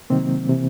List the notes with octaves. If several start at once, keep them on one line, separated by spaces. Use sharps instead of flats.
C3 D#3 F#3 A#3 C4
C3 E3